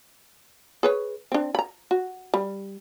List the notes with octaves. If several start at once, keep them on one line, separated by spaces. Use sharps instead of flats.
G#4 B4 C#5
C4 D4
A#5 B5
F#4
G3